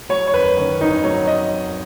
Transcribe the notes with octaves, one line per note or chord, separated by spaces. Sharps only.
F#3 C#5
C#5
F#2 B4
D#3 C#4
G#1 D#4
F#3 C#5
D#5